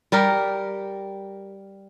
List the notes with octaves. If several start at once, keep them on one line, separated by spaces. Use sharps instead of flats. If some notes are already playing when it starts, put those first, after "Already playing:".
G3 G4 A#4